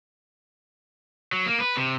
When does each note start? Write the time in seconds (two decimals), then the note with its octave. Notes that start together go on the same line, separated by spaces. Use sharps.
1.33 F#3
1.46 A#3
1.60 B4
1.77 C3